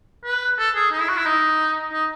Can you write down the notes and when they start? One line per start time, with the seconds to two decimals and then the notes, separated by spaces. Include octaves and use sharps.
0.25 B4
0.58 A4
0.75 G#4
0.91 D#4
1.00 E4
1.08 F#4
1.17 E4
1.26 D#4
1.93 D#4